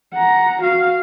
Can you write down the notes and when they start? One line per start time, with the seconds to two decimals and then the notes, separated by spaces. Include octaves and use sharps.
0.13 F#5 A#5
0.61 F#4 F5